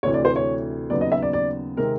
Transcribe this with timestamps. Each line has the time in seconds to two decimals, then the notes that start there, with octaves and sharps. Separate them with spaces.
0.03 D2 C3 E3 C#5
0.14 D5
0.25 C5
0.36 C#5
0.90 D#2 C#3 F#3 B3 D5
1.01 D#5
1.12 E5
1.22 D5
1.33 D5
1.77 C3 D#3 G#3 C4 A#4